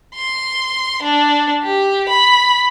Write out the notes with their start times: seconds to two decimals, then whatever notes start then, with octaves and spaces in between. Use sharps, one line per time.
0.15 C6
1.03 D4
1.63 G4
2.09 B5